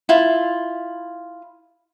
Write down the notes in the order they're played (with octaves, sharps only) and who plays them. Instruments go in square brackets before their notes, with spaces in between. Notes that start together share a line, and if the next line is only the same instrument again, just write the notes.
[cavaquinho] E4 F4